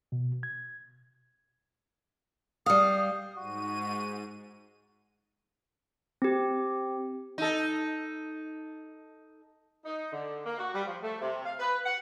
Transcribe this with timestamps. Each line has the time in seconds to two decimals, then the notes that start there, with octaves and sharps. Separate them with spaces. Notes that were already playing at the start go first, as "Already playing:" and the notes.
0.12 B2
0.43 G#6
2.66 G3 F5 D#6
3.37 G#2 F#4 D#7
6.22 C4 G4
7.38 D#4 A4
9.85 D#4
10.12 D3
10.45 A#3
10.58 F#4
10.74 G3
10.87 F3
11.02 A3
11.21 C3
11.45 F5
11.59 B4
11.86 F#5